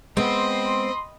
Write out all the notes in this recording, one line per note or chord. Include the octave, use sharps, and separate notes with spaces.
G#3 A3 B3 C4 D#5 B5 C6